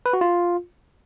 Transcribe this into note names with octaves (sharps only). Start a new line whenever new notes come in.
B4
F#4
F4